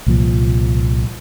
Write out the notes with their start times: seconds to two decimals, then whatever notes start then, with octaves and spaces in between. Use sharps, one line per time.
0.06 C2 A#2 F3